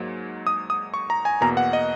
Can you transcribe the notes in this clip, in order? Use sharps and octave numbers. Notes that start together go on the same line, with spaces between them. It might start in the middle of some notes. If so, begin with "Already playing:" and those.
Already playing: G#2 F#3 A#3
D#6
D#6
C#6
A#5
G#5
E2 B2 A#3 A#5
F#5
D#5